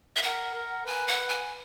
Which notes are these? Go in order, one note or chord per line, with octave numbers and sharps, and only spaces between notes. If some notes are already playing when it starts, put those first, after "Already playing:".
E5
A#4 F#5
A#4
B4 G#5
F#5
G#5